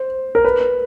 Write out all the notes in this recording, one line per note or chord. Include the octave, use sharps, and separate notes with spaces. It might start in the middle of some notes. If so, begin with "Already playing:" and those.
Already playing: C5
A#4
B4